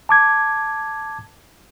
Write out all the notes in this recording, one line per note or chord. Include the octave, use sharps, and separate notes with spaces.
A5 D6 G#6